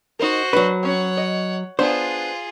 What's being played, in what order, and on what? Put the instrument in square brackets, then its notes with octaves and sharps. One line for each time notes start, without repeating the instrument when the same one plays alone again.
[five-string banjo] D#4 A#4 [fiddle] F#4 C5
[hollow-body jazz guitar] F#3 B4 [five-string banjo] D4
[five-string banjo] C4 C#4 [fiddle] C#5 F#5
[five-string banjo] D#5
[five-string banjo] B3 D4 [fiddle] F4 G#4 [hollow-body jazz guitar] C5